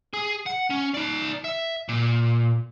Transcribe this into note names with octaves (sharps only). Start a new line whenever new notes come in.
G#4 G#5
F#5
C#4
D#4 D5
E5
A#2